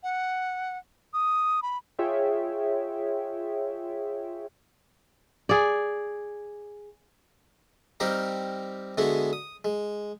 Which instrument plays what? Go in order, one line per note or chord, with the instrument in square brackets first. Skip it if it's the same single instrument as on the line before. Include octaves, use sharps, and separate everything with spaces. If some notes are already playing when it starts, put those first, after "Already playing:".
[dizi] F#5
D#6
B5
[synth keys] F4 G#4 C#5 E5 G5
[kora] G#4 D5
[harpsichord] G3 C4 D#4 G4 A#4 F5
D3 G#3 B3 E4 F#4 G#4
D#6
G#3